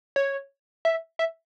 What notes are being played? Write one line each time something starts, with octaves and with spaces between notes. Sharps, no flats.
C#5
E5
E5